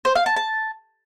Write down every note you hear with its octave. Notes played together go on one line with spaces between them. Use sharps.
C5
F5
A5
A5